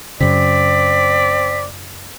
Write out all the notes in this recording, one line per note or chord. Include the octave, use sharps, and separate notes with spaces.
F#2 C#3 C4 D5 B6